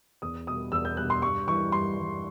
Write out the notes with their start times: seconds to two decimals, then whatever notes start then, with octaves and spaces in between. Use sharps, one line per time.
0.22 E2 D#6
0.47 B2 G3 D#6
0.72 E2 E6
0.85 G6
0.97 B2 G3 F#6
1.10 C6
1.22 G2 C#6
1.47 E3 G3 C#6
1.72 G2 C6
1.97 E3 G3